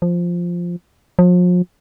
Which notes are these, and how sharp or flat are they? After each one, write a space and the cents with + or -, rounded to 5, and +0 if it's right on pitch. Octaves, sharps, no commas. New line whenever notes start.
F3 +0
F3 +40